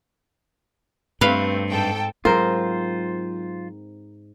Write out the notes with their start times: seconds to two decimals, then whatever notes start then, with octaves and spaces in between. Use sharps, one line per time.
1.21 G2 A3 C4 B4 F5
1.71 G#2 A4 G5
2.25 G#2 F#3 C4 F4 A#4 C5